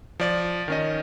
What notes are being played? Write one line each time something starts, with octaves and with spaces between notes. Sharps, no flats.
F3 D5 A6
D#3 C#4 D#5